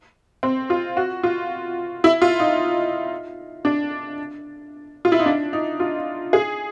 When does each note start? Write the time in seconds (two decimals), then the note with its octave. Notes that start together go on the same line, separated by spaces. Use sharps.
0.43 C4
0.70 F4
0.97 F#4
1.23 F4
2.04 E4
2.22 F4
2.40 D#4
3.65 D4
5.05 F4
5.12 E4
5.19 D#4
5.26 D4
5.53 D#4
5.80 F4
6.33 G#4